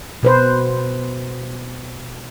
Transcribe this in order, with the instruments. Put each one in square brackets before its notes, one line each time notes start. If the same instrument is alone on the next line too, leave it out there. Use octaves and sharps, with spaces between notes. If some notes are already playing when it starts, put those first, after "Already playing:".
[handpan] B2 B4 C5